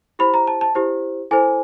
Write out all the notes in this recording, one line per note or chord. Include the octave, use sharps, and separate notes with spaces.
E4 G4 C5 B5
A#5
A5
A5
E4 G4 C5
E4 A4 C5 G#5